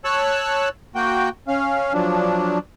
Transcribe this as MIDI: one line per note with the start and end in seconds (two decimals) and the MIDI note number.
0.04 0.69 73
0.04 0.69 81
0.04 0.69 85
0.04 0.69 88
0.04 0.69 90
0.95 1.29 58
0.95 1.29 66
0.95 1.29 79
1.48 1.93 61
1.48 1.93 77
1.93 2.58 53
1.93 2.58 54
1.93 2.58 62